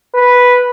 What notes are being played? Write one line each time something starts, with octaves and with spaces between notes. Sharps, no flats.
B4